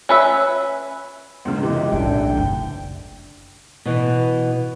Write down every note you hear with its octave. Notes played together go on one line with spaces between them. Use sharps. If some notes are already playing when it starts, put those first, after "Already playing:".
C#4 B4 E5
C#2 G#2 C#3
F#2 C3 E3 G#3 G4
B1 A2 D3 G5
F#1 G5
B2 E3